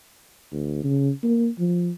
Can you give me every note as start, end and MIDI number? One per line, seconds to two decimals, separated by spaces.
0.53 0.81 38
0.83 1.10 49
1.23 1.48 58
1.58 1.90 53